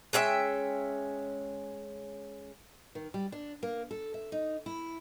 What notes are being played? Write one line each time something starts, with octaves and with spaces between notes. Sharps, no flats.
G#3 C#4 E5 G5
D#3
G3
D4
A#3
A4
E5
D#4
E4